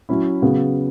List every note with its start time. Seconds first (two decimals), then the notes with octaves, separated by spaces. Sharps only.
0.09 F#3 C#4 E4
0.42 C#3 F#3 B3